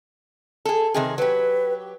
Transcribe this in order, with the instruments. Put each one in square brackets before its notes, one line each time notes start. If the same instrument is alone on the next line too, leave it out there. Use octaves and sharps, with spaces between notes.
[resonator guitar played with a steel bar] G#4 A4
C3 D#3 G#4
[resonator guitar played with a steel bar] F#3 G4 [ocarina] B4